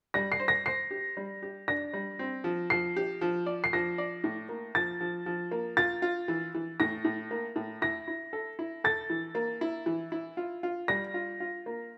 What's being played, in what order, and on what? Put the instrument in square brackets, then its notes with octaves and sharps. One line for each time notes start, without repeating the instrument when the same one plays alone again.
[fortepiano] G3 [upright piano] A#6
[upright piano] C7
[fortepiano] C5
[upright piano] A#6
[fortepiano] C5 [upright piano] C7
[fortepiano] G4
G3
G4
[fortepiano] D4 [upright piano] A#6
[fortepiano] G3
C4
F3
[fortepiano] F3 [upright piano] C7
[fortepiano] G4
F3
D5
[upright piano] C7
[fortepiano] F3 [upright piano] A#6
[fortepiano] D5
A2
A#3
[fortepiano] F3 [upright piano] A6
[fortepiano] F3
F3
A#3
[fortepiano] F4 [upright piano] A6
[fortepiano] F4
E3
E3
[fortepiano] A2 [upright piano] A#6
[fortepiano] A2
A#3
A2
[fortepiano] E4 [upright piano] A#6
[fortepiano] E4
A4
E4
[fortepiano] A4 [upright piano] A6
[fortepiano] E3
A#3
E4
E3
E4
F4
F4
[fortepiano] G3 [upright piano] A#6
[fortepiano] F4
F4
A#3